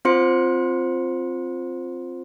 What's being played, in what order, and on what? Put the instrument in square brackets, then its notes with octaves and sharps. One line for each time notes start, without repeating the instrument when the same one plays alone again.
[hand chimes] C4 F4 C5 C6 C#7